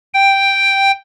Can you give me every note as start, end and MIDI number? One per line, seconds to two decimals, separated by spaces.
0.14 0.91 79